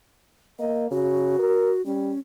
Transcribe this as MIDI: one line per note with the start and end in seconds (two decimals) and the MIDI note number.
0.59 0.88 58
0.59 0.86 75
0.91 1.38 49
0.91 1.84 66
1.39 1.71 70
1.86 2.11 55
1.86 2.19 61